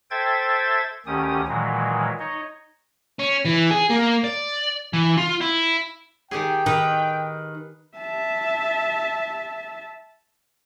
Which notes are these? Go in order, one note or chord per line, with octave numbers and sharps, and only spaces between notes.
A4 C5 E5 G5 G#6 A6
D2 D#3 C#4 G4 D#6
A#2 D#3 E3 F#3 G#3
D#4 C#5 D#5
C#4
E3
G#4
A#3
D5
E3
F4
E4
D#3 G4 G#4 G5
D#3 B4
E5 A5